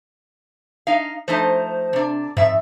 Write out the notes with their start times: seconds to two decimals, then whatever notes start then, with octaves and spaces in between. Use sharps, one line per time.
0.87 D#4 F5
1.28 F3 A3 D#4 C5
1.93 C3 D4
2.37 F2 G#2 E5